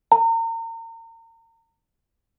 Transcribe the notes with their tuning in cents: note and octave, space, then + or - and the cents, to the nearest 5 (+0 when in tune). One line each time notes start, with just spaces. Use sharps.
A#5 -35